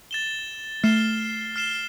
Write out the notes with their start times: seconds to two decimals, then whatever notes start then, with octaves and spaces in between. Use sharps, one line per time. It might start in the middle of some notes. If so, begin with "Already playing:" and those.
0.11 A6 E7 G7
0.83 A3 F6 C7 E7 G7
1.56 F6 C7 E7 G7